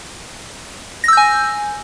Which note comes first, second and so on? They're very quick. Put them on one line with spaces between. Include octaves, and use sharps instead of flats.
A#6 E6 G6 G#5